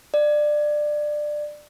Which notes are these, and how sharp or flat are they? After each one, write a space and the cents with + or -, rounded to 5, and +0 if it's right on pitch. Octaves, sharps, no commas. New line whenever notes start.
D5 +20